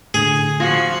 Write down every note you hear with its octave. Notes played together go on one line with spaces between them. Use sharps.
A2 D3 G#4
F3 F4 F#4 G#6 A#6